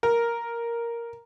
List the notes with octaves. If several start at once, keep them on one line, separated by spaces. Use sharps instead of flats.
A#4